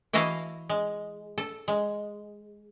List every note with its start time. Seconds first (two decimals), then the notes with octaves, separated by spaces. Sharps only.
0.13 E3 E4 F#4 D#5 F5 A5
0.69 G#3
1.38 A4
1.68 G#3